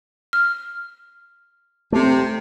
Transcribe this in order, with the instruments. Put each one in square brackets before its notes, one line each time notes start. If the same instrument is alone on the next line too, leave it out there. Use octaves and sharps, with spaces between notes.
[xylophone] F6
[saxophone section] C3 [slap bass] A3